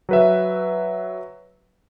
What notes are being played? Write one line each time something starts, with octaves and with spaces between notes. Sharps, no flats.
F#3 B4 E5